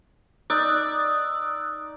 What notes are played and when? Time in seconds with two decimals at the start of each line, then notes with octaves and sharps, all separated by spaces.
0.50 D#4 D5 D#6 E6 F#6